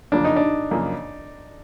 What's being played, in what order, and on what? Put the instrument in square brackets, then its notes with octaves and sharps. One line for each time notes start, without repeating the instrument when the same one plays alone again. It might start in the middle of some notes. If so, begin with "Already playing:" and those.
[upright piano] F#2 C#3 F3 A#3 [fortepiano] D4
[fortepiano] D#4
D4
[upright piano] F#2 C#3 F3 A#3